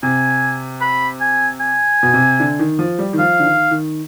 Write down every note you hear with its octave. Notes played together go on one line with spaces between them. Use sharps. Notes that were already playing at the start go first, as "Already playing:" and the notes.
C3 G#5
B5
G#5
G#5
B2
C3
D3
D#3
F3
G3
D#3
F3 F5
D3
D#3
D#3